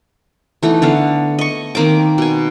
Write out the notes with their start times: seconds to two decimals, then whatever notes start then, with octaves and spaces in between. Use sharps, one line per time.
0.63 E3 A3 B3 D#4
0.82 D3 B3 F5
1.39 D#5 C#6
1.75 D#3 A#3 C4 D6
2.18 B2 G#5